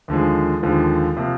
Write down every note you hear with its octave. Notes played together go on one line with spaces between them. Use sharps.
D#2 D3 F3 G#3
D#2 D3 F3 G#3
C3 F3 A#3